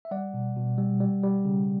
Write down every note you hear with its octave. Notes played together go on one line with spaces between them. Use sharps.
E5
G3 D5 F#5
B2
B2
G3
G3
G3
C#3